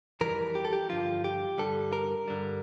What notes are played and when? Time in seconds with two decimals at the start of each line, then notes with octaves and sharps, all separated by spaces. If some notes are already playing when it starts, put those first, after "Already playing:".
0.21 F2 E3 G3 A#4
0.55 G4
0.65 A4
0.73 G4
0.89 G2 D3 F3 F4
1.24 G4
1.58 G2 D3 G3 A4
1.93 A#4
2.28 G2 D3 G3